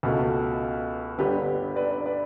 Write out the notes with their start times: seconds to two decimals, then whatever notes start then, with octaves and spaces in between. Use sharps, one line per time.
0.03 C#2 B2 A3
1.18 G1 G2 D3 G3 G4 B4
1.76 B4 D5
1.90 B4 D5
2.06 B4 D5